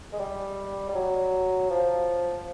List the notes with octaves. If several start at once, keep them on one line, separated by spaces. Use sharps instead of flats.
G#3
G3
G3
F#3
F3